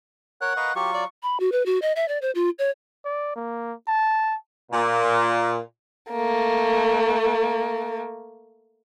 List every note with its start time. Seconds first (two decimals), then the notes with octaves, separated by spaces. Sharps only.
0.41 A#4 C#5 F#5 F#6
0.57 A#4 B4 D#5 F5 C#6
0.75 F#3 F4 G4 C#6
0.94 D5
1.23 B5
1.40 F#4
1.52 B4
1.66 F#4
1.82 D#5
1.96 E5
2.08 D5
2.22 C5
2.35 F4
2.59 C#5
3.05 D5
3.36 A#3
3.88 A5
4.71 A#2
6.12 A3 A#3